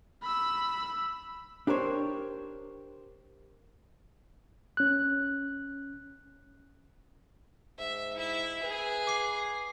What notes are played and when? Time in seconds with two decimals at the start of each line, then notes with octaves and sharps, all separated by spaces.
0.23 B5 E6
1.67 D4 G4 A#4 C5 C#5
4.77 C#4 F#6
7.78 G#2 E5
8.16 E4 E5
8.63 G#4 B4
9.07 D6 C7